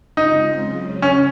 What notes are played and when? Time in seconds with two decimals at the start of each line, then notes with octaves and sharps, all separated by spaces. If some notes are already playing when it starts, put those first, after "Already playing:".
0.16 C#3 G#3 C4 D#4 F4
0.59 C#3 F#3 C#4
1.02 C#4